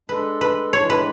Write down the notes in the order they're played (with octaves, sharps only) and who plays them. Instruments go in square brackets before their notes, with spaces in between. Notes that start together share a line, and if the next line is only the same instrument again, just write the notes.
[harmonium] G#3 D4 A4 [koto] B4
[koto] B4
[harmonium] A2 E3 G#3 D4 [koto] C#5
[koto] B4